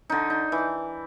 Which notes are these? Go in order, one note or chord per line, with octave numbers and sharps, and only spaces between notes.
D3 D#4
D#4
E3